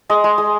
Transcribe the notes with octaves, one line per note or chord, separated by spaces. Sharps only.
G#3 D#5
G#3
G#3